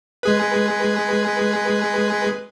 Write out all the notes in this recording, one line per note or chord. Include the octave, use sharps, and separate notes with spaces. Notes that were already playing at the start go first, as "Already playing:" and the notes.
G#3 G#4 B4